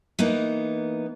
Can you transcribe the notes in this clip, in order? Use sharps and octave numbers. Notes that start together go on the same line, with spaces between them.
E3 A#3 B3 D#4